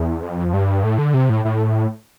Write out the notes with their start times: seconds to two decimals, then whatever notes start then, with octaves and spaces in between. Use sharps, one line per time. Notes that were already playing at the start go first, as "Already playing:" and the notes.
Already playing: E2
0.22 F2
0.54 G2
0.84 A2
0.98 D3
1.14 C3
1.30 A2
1.45 A2